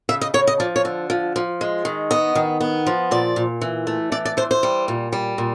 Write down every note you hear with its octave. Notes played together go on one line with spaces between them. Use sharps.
C#3 E5
D#5
C#3 C#5
D#5
F3 D5
C#5
D3
F3
F3
G#3
D#3
B3 D#5
D#3
B3
F3
A#2 D5
A#2
E3
A3
E3 D5
D5
E3 C5
C5
G3
A#2
G3
A#2